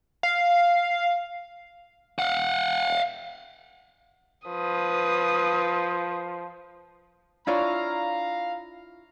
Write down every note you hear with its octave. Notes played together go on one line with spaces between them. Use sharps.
F5
F5 F#5
F3 B4 D#6
D4 E4 F4 C#5 D5 F5 A#5